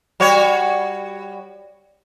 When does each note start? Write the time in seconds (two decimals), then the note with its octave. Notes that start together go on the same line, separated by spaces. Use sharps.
0.20 G3 F#4 C#5